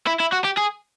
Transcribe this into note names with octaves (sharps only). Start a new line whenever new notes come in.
E4
E4
F#4
G4
G#4